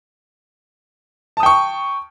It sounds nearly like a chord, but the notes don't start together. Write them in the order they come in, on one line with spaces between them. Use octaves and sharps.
A5 D#6 G5 C#6